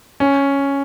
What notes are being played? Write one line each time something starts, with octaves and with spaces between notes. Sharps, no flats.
C#4